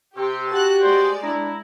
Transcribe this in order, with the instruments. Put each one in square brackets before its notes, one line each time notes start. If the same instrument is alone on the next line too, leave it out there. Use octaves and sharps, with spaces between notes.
[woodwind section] C3 [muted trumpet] C4 [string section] G4
[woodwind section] F#4 [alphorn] G4 [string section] A5 F#6
[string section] G#3 D5 [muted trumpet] C5
[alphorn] D4 [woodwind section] E4 [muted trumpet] A#5